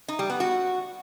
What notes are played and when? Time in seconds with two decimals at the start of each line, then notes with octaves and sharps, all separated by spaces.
0.08 D#4
0.19 G3
0.30 B3
0.40 F#4